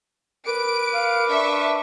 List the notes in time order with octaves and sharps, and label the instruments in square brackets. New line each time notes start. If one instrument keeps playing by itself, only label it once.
[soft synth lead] A#4 [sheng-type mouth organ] B4 D6 [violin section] D7
[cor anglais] F5
[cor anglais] D4 [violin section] E5 C#6